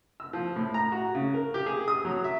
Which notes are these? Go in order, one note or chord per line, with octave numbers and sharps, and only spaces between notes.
E6
F3
A2
A#5
F#4
C#3
A#4
G4
G#4
D#6
F#3
E5